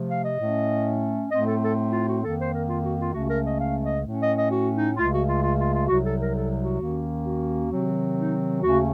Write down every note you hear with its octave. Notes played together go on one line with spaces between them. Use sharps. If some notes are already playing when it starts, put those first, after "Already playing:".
Already playing: C3 F3 A3
F5
D#5
A2 A3 C#4
A2 A3 C4 D#5
A4
A4
F4
F#4
F2 D#3 A#3 A4
C5
A#4
F4
F#4
F4
C#2 C#3 A3 C#4 F#4
A#4
D#5
F5
D#5
A2 A3 C#4
D#5
D#5
F#4
D#4
C#2 C#3 A3 F4
F#4
F4
F4
F4
F4
C2 C3 F#3 F#4
A4
A#4
A4
F#4
D#2 D#3 A#3 C#4
F#4
C3 D#3 F#3 C4
D#4
D#2 C#3 A3 C#4 F#4